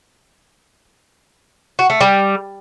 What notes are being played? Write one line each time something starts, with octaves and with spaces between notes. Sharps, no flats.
F#4
A3
G3